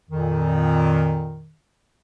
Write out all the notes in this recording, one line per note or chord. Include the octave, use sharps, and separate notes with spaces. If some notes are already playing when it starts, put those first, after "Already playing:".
F2 A#2 D#3